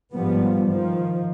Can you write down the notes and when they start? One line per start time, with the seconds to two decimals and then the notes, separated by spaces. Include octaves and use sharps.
0.13 G#1 G2 F3 G3 B3
0.67 D#3 F3